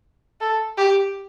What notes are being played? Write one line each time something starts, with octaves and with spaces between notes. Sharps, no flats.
A4
G4